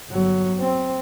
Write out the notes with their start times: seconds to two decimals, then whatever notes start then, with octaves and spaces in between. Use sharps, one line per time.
0.10 G1 F#3
0.60 C4